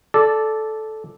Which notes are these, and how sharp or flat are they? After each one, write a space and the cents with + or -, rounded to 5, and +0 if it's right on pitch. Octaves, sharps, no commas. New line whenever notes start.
A4 -10 D5 +0